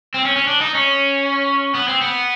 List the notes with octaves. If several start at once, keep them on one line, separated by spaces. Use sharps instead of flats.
C4
C#4
C#4
D4
D#4
C#4
B3
C4
B3